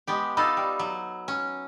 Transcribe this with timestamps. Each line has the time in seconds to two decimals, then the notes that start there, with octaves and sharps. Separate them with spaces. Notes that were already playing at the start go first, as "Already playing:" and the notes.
0.07 G#3 B3 G4
0.37 D#4 F4 A4 B5 E6
0.57 G3
0.79 F#3
1.28 C#4